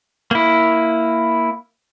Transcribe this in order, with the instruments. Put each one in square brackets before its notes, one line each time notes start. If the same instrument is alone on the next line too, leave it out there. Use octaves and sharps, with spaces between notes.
[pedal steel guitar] A#3 E4